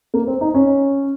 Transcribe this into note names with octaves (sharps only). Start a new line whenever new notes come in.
A#3
C4
D#4
C#4